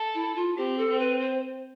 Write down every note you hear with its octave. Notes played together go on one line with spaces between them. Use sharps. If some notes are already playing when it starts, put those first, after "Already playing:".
Already playing: A4
E4
F4
C4 G4
A4
C4
B4
C5